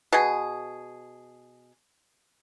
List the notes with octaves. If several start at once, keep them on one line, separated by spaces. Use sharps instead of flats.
B2 G#4